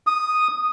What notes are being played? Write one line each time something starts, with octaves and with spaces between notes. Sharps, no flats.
D#6